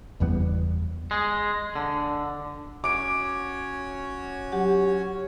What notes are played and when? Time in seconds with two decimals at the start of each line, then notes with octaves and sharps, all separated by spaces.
0.20 F#1 E2 G3 B3
1.11 G#3
1.75 D3
2.84 C#4 F#4 C#5 D6 D7
4.52 F#3 G4 F#5